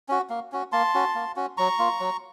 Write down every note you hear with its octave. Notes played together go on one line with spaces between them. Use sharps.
C#4 F#4
A#3
C#4 F#4
A#3 A5 C6
C#4 F#4
A#3
C#4 F#4
F#3 A#5 C#6
A#3 F4
F#3